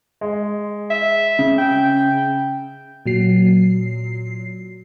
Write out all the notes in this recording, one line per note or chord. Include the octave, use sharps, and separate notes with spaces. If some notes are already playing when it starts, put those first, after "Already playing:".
G#3
E5
C#3
G5
A#2 F#3 C7